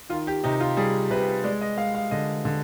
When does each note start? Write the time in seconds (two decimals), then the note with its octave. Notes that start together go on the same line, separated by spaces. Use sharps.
0.09 D#3 F4
0.27 G4
0.44 C3 D#4
0.60 F4
0.77 G3 G#4
1.10 C3 B4
1.44 G#3 D5
1.61 D#5
1.78 G#3 F5
1.95 F5
2.11 D3 D#5
2.45 D3